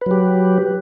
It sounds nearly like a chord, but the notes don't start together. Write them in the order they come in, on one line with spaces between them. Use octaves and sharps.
B4 F#3 G4